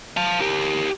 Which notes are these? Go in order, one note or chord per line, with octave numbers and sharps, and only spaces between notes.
F5 A5
G4 A#4